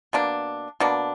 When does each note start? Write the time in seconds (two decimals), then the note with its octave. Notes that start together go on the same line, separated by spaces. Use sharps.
0.13 B2 A#3 D4
0.80 B2 A#3 D4